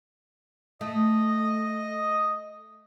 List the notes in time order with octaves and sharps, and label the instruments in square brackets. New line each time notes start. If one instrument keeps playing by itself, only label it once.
[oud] A3 [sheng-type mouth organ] D#5